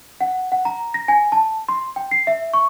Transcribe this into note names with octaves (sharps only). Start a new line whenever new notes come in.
F#5
F#5
A#5
A#6
G#5
A5
C6
G5
C7
E5
C#6